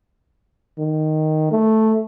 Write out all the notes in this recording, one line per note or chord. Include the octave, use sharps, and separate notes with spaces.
D#3
A3